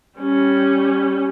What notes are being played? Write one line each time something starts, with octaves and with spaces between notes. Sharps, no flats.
G3 C#4